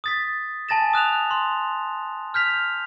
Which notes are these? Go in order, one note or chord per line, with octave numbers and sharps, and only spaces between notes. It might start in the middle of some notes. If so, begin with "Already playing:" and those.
D#6 A6 B6
G#5 A5 A6 A#6 E7
D#6 F#6 E7 F7
C6
F6 G6 B6 F7